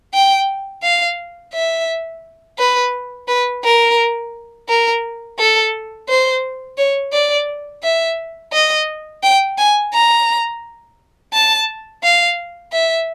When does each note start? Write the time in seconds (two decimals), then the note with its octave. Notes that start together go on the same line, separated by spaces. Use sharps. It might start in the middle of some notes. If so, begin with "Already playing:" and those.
0.14 G5
0.83 F5
1.53 E5
2.59 B4
3.28 B4
3.64 A#4
4.69 A#4
5.39 A4
6.09 C5
6.78 C#5
7.13 D5
7.83 E5
8.53 D#5
9.23 G5
9.58 G#5
9.94 A#5
11.33 A5
12.03 F5
12.72 E5